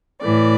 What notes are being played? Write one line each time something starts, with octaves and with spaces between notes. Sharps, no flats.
A2 E3 D5